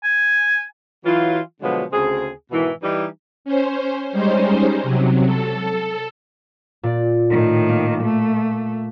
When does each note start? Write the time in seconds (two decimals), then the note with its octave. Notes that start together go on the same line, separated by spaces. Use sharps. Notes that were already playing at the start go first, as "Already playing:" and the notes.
0.04 G#5
1.05 E3 F#3 F4
1.62 B2 D3 F3 F#3 G#3 B3
1.92 D2 C#3 C4 G#4
2.51 G#2 B2 D#3 E3
2.83 E3 G3 D#4
3.45 C#4 C5
4.12 G3 G#3 C#4 D#4 C5
4.83 C3 F#3
5.26 A4
6.83 A#2 D5
7.29 A2 D#3
7.69 A#3
8.03 A3